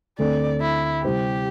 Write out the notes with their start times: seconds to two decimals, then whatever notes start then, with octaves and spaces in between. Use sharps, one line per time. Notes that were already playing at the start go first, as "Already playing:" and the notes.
0.18 D2 D3 C4 A4 D5
0.61 E4
1.04 C3 G3 E4 G4 C5